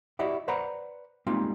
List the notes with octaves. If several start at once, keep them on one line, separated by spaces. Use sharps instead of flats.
E4 F#4 G4 D5 D#5 F#5
B4 C5 D5 F#5 A#5 B5
G3 G#3 A#3 C4 D#4 F4